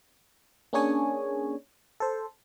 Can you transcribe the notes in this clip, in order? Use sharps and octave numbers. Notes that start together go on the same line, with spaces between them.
A#3 C#4 D4 G#4 C#5 G#5
A4 C5